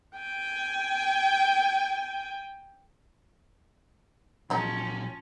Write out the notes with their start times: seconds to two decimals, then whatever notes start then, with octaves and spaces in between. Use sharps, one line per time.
0.17 G5 G#5
4.50 A#2 C#3 F3 F#3 C#4 D#4